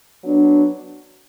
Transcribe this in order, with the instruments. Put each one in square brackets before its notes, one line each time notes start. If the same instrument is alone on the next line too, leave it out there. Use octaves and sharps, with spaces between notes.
[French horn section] F#3 B3 D4